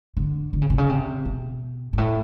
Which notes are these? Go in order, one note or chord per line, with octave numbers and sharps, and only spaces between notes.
D3
D3
C#3
C3
C#3
C3
B2
G#2
A2